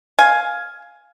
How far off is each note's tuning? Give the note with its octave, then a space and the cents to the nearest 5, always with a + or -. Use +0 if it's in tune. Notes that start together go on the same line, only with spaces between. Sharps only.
F5 +5 G#5 +5